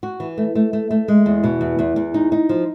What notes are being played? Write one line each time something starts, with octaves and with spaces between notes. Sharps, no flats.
F#4
E3
A3
A3
A3
A3
G#3
E2
B2
E2
E2
E2
D#4
D#4
F3